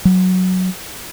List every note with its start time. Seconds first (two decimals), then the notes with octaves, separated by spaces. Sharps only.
0.05 F#3